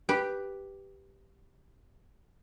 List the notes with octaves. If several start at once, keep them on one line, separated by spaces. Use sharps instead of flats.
G4 B4